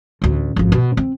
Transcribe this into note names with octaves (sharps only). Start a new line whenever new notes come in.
A1 D2
G#1 F2
B2
C4